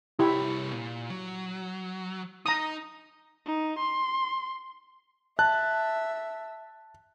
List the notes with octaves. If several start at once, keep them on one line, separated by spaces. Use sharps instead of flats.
C2 E4 G4 C#5
A#2
F#3
D#4 A#5 D#6
D#4
C6
E5 A5 F#6